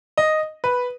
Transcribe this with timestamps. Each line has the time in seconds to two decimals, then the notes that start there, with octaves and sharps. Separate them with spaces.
0.18 D#5
0.64 B4